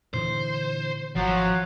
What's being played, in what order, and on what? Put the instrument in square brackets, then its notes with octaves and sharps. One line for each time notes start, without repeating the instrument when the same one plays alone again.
[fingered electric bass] A#2 D3 E3 [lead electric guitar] C5
[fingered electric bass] G#1 [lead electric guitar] F3 [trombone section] F#3